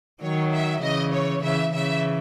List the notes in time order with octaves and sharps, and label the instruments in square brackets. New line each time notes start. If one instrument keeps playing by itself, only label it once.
[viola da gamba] D#3 F#3 [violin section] C#5
[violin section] E5
[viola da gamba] C#3 E3 [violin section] D#5
[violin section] C#5
[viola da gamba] C#3 E3 [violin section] E5
[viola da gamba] C#3 E3 [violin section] E5